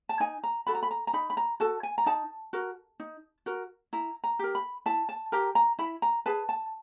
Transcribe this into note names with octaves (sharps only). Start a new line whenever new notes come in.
A5
D#4 G#5
A#5
F#4 A4 B5
A#5
B5
A#5
A#5
D#4 B5
B5
A#5
F#4 A4 A5
G#5
A#5
D#4 A5
F#4 A#4
D#4
F#4 A#4
E4 A#5
A#5
G4 A#4
B5
E4 A5
A5
G4 A#4 A#5
A#5
E4 B5
A#5
G#4 B4 A5
A5